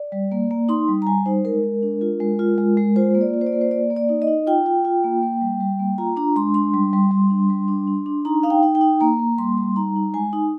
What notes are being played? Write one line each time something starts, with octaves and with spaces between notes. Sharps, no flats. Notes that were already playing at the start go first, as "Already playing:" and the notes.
Already playing: D5
G3
A#3
A#3
D#4 C6
G3
A#5
G3 G#5
D#4 C5
G#3 A#4
G#3
D4
F4
G#3
F4
G#3
G#3
F4 C5
A#3
D5
F4
C5
D5
A#3
C5
A#3 D5
A#3
D5
D#4
D#5
D#4
F4 G5
F4
F4
A#3
A#3
G3
G3
A#3
F4 A#5
D4 A#5
G#3 C6
D4 C6
G3
G3
G3
D4
G3
D4
D4
D4
D#4 A#5
D#4 F5
G5
D#4
G5
D#4
A#3 A#5
A#3
G3 C6
G3
D#4 A#5
D#4
G#3 G#5
D#4